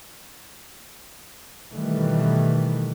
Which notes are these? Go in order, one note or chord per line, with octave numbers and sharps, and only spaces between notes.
B2 D#3 E3 G3 A3